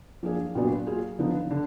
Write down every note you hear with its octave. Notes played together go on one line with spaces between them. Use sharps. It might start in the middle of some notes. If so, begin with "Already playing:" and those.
F3 A#3 D4 G#4
A#2 F#3 B3 D4 F#4
F#3 A#3 F4 G#4
D3 F3 B3 D#4
D3